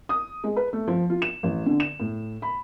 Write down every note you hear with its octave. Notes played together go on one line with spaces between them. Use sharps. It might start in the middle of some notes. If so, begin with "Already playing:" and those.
D#6
G#3
B4
A3
F3
F4
E7
A1
D3
E7
A2
B5